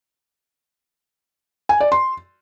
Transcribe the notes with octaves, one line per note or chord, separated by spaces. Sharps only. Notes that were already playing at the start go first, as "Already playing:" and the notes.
G#5
D5
C6